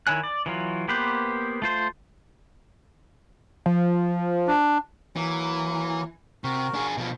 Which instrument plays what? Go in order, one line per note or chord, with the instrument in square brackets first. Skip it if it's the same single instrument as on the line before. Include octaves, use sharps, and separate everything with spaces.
[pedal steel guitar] D#3 E4 C#5 G#5 F#6
D5
E3 F#3 F4
A#3 B3 G4 B4 C5
A3 F4 C5
[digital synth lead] F3
[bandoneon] D4
[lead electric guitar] E3 [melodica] F#3 A#3
[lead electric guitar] C3 [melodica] F#4 A#4
[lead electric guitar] D4 G#4
B2 F3